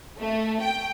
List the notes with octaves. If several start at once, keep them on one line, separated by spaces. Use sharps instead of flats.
A3
G5